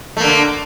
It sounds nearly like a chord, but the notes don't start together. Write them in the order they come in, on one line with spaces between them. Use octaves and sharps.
A3 A#3 D3